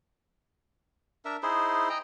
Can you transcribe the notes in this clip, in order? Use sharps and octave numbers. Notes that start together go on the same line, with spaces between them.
D4 A#4 E5
D#4 E4 G#4 C5
D#5 G5 A#5